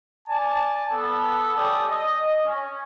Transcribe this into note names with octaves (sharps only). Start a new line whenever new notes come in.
D5 G#5 A5
B3 A4
G3 C#4 G4 A4 D5 D#6
D#5
C#4